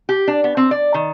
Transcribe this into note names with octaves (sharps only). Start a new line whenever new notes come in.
G4
D4
B3
C4
D5
D#3